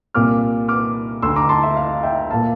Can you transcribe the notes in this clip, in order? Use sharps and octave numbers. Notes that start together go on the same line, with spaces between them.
C2 A#2 D6 F6
D6 F6
D2 D3 C6 E6
A#5 D6
A5 C6
E5
F5
E5 G5
A#2 F5 A5